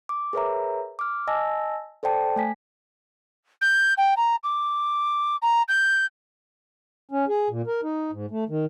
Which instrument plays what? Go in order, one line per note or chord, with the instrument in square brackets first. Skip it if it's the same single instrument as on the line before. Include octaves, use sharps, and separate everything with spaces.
[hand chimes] D6
G#4 A#4 B4 C#5 E5 A#5
D6 F6
D#5 G#5 A5 E6 A#6
A4 C5 D5 G5 A5
A3 G#5 B6
[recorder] G6
G5
A#5
D6
A#5
G6
[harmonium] C#4
G#4
A#2
A#4
D#4
G#2
A3
D#3